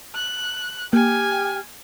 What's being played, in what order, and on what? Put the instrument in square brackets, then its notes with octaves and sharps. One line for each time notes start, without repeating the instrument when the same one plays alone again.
[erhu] F#6
[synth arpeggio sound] A#3 [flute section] G4 G5 F6 [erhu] G#5